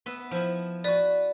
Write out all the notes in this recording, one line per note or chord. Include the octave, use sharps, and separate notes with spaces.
B3 B4 E5
F3 E4
F#4 B4 D5